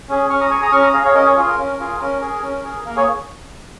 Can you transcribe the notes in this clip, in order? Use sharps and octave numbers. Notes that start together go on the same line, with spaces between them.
C#4 G#4
C#4 C#6 F6
A#5 D#6
G#4 G#5 C#6
A#5 D#6
C#4 C#6 F6
A#5 D#6
G#4 F5 A#5
C#5 F5
C#4 A#4 D#5
G#4 C#5
F4 G#4
A#4
C#4
F4 G#4
C#4 A#4
G#4
C#4
G#4
A#3 A#4
G#4 C#5